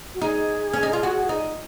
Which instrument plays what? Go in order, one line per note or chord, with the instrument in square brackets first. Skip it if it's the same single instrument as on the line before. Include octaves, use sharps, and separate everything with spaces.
[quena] F#4
[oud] D#4 [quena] G#4
[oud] C#4
D#4
F4
F#4
D#4